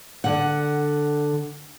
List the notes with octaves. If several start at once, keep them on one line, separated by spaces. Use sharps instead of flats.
D3 F#5